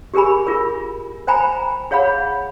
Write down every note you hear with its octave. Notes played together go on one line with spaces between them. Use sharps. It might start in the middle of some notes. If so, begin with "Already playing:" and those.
G4 G#4 A#4 G#5 B5
F4 G#4 A#4
C5 G5 G#5 A#5 B5
G#4 C#5 F5 F#5 B5